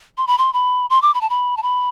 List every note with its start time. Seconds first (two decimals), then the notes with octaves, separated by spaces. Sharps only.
0.18 C6
0.27 B5
0.38 C6
0.53 B5
0.90 C6
1.02 D6
1.14 B5
1.21 A5
1.30 B5
1.57 A5
1.63 B5